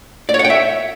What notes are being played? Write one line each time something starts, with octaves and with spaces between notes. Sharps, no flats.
D5
C#5
F#5
G5
E5